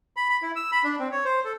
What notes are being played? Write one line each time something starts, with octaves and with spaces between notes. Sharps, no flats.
B5
B5
E4
E6
B5
D4
C4
C#5
C5
A4